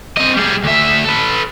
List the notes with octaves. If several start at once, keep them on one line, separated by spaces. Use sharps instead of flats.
C4 D#5
G3 G#4
D2 E5
A4 B4